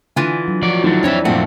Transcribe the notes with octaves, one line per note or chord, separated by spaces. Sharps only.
D3 E3 F4 G#5
F#3
F3 F#3 D5
D3 D#3 F#3 E4 A6
F2 E3 C4 D4 C#5 E5
F#1 A#2 F3 A3 C4 F#5